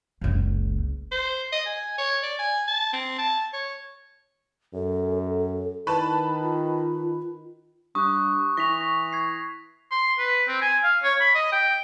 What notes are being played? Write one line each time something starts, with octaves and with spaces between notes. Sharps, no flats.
F#1 C#2
C5
D#5
G#5
C#5
D5
G#5
A5
C4
A5
C#5
F#2 A4
D#3 E4 B4 A5
F4
G2 C#6 D#6 F#6
E3 C#6 A#6 B6 F7
A#6
G#6 C7
C6
B4
C4
G#5
F5
C#5
B5
D#5
G5